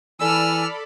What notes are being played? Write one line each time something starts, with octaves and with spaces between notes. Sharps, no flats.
E3 A4 D5 G#5 B5 E6 F6